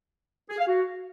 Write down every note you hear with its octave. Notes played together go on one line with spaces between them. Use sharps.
G#4
F5
F#4